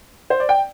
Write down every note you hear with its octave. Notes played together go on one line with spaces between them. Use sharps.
C5
D5
G5